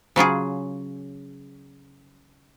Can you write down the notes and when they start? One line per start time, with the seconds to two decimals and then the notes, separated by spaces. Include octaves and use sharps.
0.16 C#3 F#3 F4 G#4